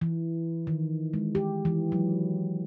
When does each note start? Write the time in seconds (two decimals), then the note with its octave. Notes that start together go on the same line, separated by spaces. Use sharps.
0.01 E3
0.67 D#3
1.13 G#3
1.35 G4
1.65 E3
1.92 F#3